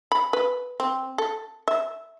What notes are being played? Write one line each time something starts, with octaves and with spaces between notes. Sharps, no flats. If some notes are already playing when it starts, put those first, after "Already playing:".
B5
B4
C4
A4
E5